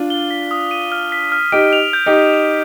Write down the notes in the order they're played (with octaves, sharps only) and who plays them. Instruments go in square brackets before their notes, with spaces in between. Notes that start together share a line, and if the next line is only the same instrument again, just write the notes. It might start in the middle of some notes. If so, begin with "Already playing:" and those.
Already playing: [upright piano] D4 F4
[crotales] G7
B6
D#6
D#7
F6
B6
F6
[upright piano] D#4 G4 [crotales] D7
[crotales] F7
G6
[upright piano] D#4 G4
[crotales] D6
F7